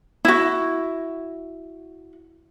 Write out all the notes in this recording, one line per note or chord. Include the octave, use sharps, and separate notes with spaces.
E4 F#4